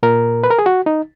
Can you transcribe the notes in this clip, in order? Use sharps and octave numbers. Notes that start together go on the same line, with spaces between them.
A#2 A#4
B4
A#4
G#4
F#4
D#4